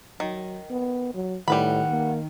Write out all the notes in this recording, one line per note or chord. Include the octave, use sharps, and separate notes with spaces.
D#3 F#3
B3
F#3
A2 D#3 G3 B4 F#5 B5
A#3